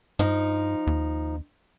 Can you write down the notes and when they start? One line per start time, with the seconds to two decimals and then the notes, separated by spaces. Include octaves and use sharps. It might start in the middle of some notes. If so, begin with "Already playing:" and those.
0.19 G2 F3 D#4
0.87 D#2